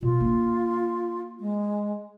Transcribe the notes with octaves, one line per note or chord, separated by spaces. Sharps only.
B2 F4
A#3 D4
G#3